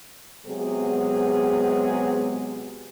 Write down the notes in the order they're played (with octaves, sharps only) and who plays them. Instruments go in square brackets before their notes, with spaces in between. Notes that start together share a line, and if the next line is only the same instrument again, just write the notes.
[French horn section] C3 F#3 G#3 B3 G#4